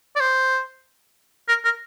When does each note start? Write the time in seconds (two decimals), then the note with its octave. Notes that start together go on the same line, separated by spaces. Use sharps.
0.16 D5
0.20 C5
1.49 A#4
1.64 A#4